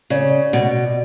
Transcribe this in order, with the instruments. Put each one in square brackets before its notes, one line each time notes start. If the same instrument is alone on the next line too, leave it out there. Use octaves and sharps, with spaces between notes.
[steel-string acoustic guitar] C#3 [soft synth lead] D5
[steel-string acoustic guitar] B2